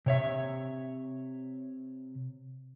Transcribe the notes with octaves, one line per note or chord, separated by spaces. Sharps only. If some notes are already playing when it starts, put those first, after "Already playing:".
C3 C#5 E5